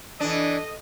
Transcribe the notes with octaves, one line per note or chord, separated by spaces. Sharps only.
E3 D4 A4 D#5